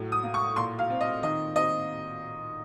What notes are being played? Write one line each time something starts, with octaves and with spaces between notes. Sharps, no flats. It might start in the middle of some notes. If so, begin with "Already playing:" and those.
Already playing: A2 F#3
D#6
A#3
C#6
A#2 C6
F5
C4
D#5
D#3 D#5
C4 D#5